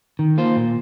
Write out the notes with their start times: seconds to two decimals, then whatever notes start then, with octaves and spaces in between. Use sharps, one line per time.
0.19 D#3
0.37 A#3 F4 C5
0.56 A#2